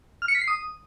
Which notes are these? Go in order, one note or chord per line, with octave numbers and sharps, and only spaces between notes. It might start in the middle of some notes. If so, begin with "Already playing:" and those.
F6
C#7
B6
C7
D#6